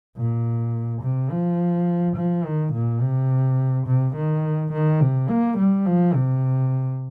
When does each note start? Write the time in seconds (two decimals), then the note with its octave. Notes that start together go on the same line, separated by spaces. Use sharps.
0.17 A#2
1.02 C3
1.31 F3
2.16 F3
2.45 D#3
2.73 A#2
3.01 C3
3.87 C3
4.15 D#3
4.72 D#3
5.00 C3
5.29 A#3
5.58 G3
5.86 F3
6.14 C3